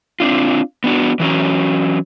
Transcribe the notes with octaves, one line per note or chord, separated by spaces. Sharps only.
C4 D4 F4
B3 D4 F#4
E3 F#3 C#4 A#5